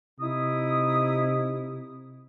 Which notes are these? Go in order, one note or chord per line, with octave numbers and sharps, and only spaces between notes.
C3 D#4 E4 D#6